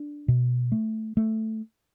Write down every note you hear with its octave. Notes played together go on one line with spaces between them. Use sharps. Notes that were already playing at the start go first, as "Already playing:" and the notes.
Already playing: D4
B2
A3
A3